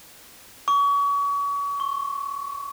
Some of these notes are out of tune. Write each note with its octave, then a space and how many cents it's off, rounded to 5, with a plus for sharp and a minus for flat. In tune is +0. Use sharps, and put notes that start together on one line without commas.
C#6 +35
C#6 -25